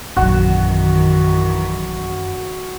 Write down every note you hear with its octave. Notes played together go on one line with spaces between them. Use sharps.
A#1 F#2 D#3 E3 F#3 F#4